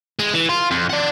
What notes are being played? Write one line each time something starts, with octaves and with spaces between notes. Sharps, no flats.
G#3
E3
F4
F2
D5 F#5